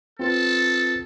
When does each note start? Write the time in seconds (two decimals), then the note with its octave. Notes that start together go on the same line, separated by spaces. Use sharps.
0.19 C4 F4 A4 B4